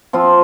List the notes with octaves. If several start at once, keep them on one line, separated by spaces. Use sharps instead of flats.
F3 C4 F4